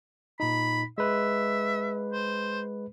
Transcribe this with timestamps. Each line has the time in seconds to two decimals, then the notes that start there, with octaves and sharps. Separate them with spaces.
0.40 A#2 D#4 B5
0.98 G#3 B4 E5
2.12 C5